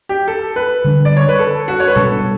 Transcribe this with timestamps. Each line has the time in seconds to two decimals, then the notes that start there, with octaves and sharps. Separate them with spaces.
0.09 G4
0.28 A4
0.56 B4
0.85 D3 G3 D4
1.05 D5
1.17 C#5
1.29 B4
1.39 A4
1.68 F#4
1.80 C#5
1.87 B4
1.95 B2 G3 D4 A4